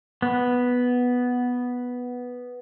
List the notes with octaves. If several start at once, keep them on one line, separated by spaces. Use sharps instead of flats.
B3